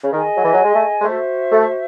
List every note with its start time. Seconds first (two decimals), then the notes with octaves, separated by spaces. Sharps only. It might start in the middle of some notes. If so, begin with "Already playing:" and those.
0.04 C#3
0.13 D#3 G#4 D#5 G#5
0.37 F#3
0.44 E3
0.54 F#3
0.64 G#3
0.75 A3
1.01 G#3
1.04 A3 F#4 C5 E5
1.52 A3